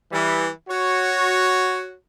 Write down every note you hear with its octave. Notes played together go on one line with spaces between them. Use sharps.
E3 G3
F#4 C#5